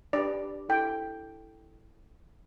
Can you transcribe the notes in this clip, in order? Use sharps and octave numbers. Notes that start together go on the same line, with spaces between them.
D4 G4 B4 D5
E4 A4 G5